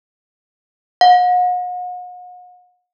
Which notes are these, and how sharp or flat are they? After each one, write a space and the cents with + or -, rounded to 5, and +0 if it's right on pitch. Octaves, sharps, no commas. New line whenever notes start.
F#5 -45